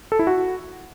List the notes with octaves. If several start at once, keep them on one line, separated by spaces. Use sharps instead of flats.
A4
E4
F#4